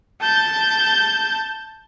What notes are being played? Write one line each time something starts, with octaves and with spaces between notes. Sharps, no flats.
A5 G6